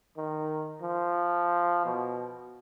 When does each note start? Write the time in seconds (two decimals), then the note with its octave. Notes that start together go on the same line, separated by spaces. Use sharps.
0.17 D#3
0.82 F3
1.85 B2